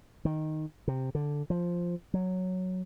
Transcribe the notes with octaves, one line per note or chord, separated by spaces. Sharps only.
D#3
C3
D3
F3
F#3